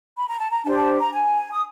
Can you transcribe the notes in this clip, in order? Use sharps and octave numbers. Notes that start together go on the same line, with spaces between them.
B5
A#5
A5
A#5
D4 G4 C5 A5
A5
A#5
G#5
D#6